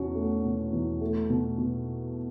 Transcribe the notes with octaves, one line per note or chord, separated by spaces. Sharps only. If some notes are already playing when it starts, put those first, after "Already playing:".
Already playing: E2 B2 C#4 F#4
A3
B2
E2
A3
B2
B2